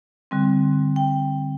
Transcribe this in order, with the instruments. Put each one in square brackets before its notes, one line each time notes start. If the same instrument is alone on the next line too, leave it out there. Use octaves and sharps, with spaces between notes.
[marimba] D3 G3 C4
G5